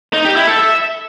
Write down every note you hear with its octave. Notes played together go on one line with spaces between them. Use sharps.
D#4
G4
E4
A4
E5